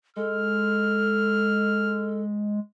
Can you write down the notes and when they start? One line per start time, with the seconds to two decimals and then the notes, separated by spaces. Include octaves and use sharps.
0.16 G#3 A4 F6